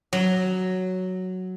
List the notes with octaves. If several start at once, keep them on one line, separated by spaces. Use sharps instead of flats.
F#3